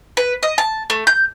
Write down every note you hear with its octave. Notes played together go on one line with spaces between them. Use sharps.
B4
D#5
A5
A3
G6